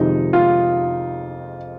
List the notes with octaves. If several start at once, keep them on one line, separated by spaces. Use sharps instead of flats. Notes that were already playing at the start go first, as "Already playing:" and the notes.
Already playing: F2 C3 D#3 G#3 D#4
F4